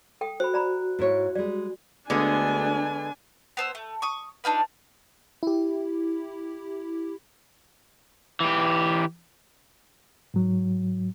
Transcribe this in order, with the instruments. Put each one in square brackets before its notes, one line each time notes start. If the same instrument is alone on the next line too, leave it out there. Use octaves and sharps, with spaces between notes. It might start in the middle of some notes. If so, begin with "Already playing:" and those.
[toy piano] A4 G5 D#6
[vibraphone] F#4 [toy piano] C5 B5
[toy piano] D5 A#5 B5
[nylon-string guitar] G#2 E4 C#5
[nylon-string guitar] G3 G#3 [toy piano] D5
[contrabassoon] D2 [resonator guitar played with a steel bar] D3 G#3 B3 [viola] D4 G#5
[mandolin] B3 C5 E6
A3
C#6 D#6
D4 D#4 F4 B4
[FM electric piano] E4 G4
[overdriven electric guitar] E3 G4
[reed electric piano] G#2 F#3